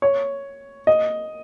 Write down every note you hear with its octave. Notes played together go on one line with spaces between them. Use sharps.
C#5
D#5